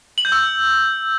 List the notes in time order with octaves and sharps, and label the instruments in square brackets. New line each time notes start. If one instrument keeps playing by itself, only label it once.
[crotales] F#7
G6
E6